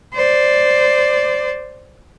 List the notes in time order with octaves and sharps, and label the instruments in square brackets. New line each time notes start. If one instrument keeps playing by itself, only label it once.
[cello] C5 D5